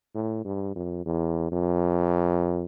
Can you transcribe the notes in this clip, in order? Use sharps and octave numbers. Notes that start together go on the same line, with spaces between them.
A2
G2
F2
E2
F2